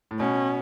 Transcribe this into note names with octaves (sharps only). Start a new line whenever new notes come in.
A2
B2 C#4